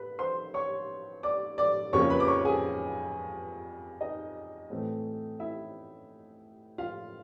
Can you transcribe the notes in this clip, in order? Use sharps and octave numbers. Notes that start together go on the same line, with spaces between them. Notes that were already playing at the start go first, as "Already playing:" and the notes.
Already playing: B4 B5
C5 C6
C#5 C#6
D5 D6
D5 D6
F2 C#3 F3 A#3 C#5 C#6
B4 B5
D6
C#5 C#6
G#4 G#5
D#4 D#5
A2 E3 A3 C4
E4 E5
F4 F5